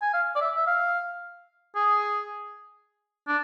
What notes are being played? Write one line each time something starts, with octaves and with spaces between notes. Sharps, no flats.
G#5
F5
D5
E5
E5
F5
G#4
D4